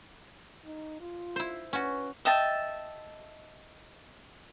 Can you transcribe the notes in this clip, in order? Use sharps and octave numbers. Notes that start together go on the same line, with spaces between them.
D#4
F4
E4 C5
C#4 F#4 B4
D#5 E5 G5 A5